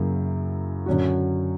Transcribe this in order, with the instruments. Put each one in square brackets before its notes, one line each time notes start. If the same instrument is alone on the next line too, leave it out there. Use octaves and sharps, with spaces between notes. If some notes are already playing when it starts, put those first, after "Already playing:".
Already playing: [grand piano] F#2 C#3 F#3 A#3 E4
F#2 D3 F#3 C#4 F#4